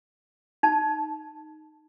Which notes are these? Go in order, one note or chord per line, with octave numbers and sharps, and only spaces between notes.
D#4 A5